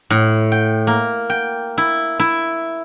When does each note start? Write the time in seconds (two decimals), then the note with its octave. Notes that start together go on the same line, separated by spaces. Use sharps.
0.10 A2
0.52 G5
0.87 A#3
1.30 G5
1.78 E4
2.20 E4